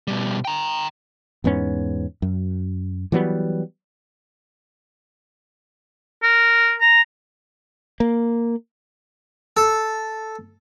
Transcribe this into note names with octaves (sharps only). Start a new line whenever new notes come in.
B2 G3
G5 A#5
E2 G#2 B3 C#4
F#2
E3 F#3 G3 B3
A#4
A#5
A#3
A4